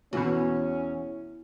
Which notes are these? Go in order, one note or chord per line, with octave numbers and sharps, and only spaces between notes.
E2 B2 E3 C#4 F#4